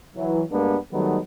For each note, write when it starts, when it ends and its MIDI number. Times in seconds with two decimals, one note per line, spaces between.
0.16 0.42 52
0.16 0.42 54
0.50 0.77 43
0.50 0.77 55
0.50 0.77 56
0.50 0.77 58
0.50 0.77 59
0.50 0.77 62
0.92 1.18 51
0.92 1.18 54
0.92 1.18 55
0.92 1.18 57
0.92 1.18 59
0.92 1.18 63